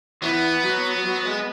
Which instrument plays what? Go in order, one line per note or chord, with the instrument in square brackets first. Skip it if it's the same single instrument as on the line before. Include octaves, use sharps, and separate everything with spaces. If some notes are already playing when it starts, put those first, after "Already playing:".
[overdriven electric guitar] E3 [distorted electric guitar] B3
[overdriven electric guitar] F#3
F#3
G#3